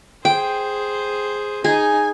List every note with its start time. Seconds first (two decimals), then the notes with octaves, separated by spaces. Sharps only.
0.25 G#4 C5 G5
1.64 D#4 G#4 G#5